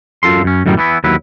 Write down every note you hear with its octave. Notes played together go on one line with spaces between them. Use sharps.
F#2 F4 A4 C6
F#2 C#4
F#2 A2 D#3 F#3 G3
E3 B3 E4
D#2 F#3 E4 B4